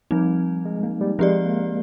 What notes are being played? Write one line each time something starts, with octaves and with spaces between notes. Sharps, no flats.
F3 G3 C4 D#4
G#3
A#3
G3
F3 G#3 C4 G4 D5
A#3